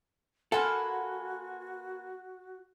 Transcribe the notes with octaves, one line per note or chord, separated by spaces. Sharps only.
A#3 C#4 F#4 A4 B4 F#5 G#5 C6